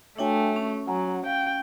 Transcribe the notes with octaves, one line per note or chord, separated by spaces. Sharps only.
A3 D4 F#4 C#5 E5 G5 G#5
C#4
F#3 F#5 G#5 A#5
F5 G5